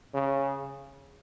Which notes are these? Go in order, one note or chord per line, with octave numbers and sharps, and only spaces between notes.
C#3